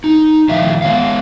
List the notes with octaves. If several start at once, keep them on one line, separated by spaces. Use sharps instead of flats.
D#4
A2 D#3 F3 E5 F5
G#3 B3 C#5 F5